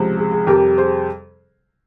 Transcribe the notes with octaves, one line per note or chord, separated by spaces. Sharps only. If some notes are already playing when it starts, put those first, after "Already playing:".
Already playing: C#2 C3 F3
G#4
G#4
F2 C3 G3 G4 A#4
G#4 C5